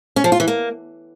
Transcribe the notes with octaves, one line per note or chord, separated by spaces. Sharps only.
C#4
F3
F4
E3
A#3